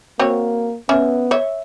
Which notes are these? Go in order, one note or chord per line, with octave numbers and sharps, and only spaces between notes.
A#3 C4 F#4 C#5
B3 C#4 E5
C#5 E5